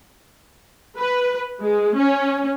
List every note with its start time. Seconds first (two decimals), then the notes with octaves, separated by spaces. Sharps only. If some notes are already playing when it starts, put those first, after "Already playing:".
0.98 B4
1.61 G#3
1.97 C#4